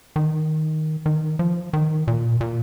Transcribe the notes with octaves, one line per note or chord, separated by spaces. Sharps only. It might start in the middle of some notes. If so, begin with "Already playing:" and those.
D#3
D#3
F3
D#3
A#2
A#2